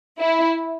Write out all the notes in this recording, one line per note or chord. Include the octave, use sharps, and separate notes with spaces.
E4